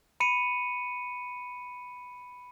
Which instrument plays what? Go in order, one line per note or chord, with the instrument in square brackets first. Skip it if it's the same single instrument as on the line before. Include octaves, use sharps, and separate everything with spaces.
[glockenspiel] B5 C#7 D#7